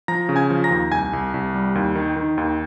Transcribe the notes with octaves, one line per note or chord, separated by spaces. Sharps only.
F3 A#5 A#6
C#3
G#5 G#6
F3
A#5 A#6
D#2
C2 G#5 G#6
C2
C2
G3
D#2
D#3
D#3
D#2